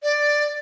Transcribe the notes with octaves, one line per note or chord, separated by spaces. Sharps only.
D5